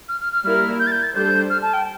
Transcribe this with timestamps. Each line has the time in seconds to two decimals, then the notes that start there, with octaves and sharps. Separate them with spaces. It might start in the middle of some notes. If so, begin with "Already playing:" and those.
0.09 F6
0.20 F6
0.33 F6
0.44 G3 A#3 E4 A#4 F6
0.79 G6
0.87 A6
0.92 G6
1.03 A6
1.15 G3 D4 A4 C5 G6
1.50 F6
1.62 A5
1.73 G5